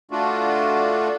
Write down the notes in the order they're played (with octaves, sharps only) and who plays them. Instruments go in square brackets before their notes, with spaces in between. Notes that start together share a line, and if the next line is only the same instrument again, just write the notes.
[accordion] A3 D4 F4 F#4